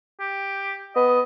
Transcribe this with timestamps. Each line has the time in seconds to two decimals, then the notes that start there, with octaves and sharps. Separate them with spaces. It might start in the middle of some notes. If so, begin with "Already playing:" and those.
0.20 G4
0.96 B3 D#5